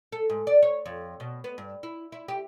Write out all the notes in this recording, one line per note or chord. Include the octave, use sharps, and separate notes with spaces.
A4
G#2
D5
C#5
F2
B2
B3
G2
E4
E4
G4